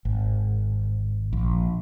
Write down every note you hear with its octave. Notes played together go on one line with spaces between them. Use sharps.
G#1
A#1